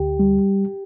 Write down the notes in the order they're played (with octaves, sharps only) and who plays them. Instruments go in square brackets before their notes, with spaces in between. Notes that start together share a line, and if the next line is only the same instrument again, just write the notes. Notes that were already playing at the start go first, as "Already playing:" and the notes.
Already playing: [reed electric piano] D2 G4
G3